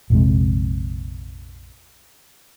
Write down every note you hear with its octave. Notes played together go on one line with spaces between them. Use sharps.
A#1 F2 C3 G#3